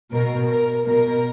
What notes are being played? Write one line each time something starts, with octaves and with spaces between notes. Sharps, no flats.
B2 A#4
A#4
B2 A#4